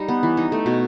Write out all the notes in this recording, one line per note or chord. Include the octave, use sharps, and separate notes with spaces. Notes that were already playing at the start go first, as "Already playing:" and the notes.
Already playing: G3 D#4
B3
E3
D#4
A3
B2